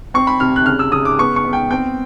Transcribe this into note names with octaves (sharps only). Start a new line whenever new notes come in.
C4 C#6
B5
C3 F6
F#6
C#3 F6
E6
C#3 D#6
D6
B3 C#6
C#6
B3
G5
C4 G5